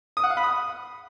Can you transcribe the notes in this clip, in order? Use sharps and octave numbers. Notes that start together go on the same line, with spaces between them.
D#6
F#5
F5
B5
D#6